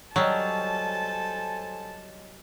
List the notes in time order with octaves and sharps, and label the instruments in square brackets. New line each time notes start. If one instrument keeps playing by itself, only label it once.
[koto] F#3 G3 [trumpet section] A4 C5 G#5 [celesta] C#5 D#5 [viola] A5